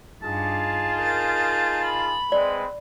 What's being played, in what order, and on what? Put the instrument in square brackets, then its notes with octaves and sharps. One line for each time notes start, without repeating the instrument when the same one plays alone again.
[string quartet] G2 [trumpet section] D#4 F4 G#4 [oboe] A5
[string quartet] A#4 G6 A6
B5
[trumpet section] G#3 C4 B4 [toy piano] D5